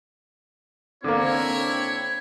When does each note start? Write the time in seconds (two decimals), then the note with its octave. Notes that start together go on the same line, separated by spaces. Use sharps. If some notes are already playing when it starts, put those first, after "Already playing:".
1.04 D3 A#3 C4 D4 E4 C#5